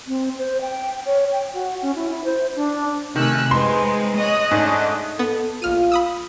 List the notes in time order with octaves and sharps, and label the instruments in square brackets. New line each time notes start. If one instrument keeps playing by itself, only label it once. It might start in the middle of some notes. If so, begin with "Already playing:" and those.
[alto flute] C4
C5
G5
C#5
G5
F#4
C#4
E4
E4
C5
D4
[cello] C3 A3 [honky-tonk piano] D#3 [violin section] G#5 E6 F#6
[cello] G#3 [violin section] C4 D#4 B4 [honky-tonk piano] C6
[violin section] C#5 D#6 F#6 [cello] D#5
[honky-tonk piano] G#2 [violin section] A3 C#4 D4
[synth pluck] B3 [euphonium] A4
[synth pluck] A#1 F6 D#7 [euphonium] F4
[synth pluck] B5 D#6 E6